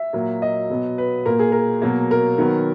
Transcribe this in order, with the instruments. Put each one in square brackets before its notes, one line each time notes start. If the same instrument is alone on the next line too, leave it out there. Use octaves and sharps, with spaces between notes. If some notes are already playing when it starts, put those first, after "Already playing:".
Already playing: [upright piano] E5
A#2 F#3 A#3
D#5
B2 F#3 B3
B4
A#2 A#3 A#4
G#4
A#4
B2 F#3 A#3
A#4
D#3 F#3 B3